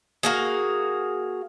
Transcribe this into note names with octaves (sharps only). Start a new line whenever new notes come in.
A#3 F#4 G#4